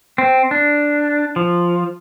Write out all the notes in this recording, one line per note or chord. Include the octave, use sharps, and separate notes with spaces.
C4
D4
F3